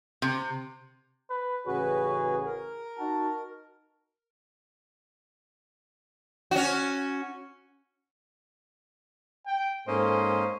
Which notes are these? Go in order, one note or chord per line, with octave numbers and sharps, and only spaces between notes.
C3
B4
A1 C#3 F#4 G#4 B4 C#5
A#4
D#4 F#4 A5
C#4 F#4
G5
G#2 A#3 C#4 A4 C5 D#5